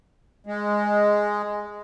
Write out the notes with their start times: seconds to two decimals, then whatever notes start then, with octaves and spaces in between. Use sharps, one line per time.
0.47 G#3